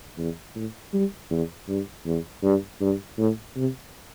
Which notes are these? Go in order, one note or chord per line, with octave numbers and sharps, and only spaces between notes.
E2
A2
G3
E2
G2
E2
G2
G2
A2
C3